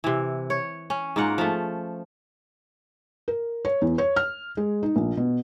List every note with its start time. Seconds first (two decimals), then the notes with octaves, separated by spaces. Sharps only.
0.04 C3 E3
0.50 C#5
0.90 C#4
1.16 G#2 A#3 F4 F#5
1.38 F3 A3
3.28 A#4
3.65 C#5
3.82 E2
3.98 C#5
4.16 F6
4.57 G#3
4.83 D#4
4.96 A#1
5.17 B2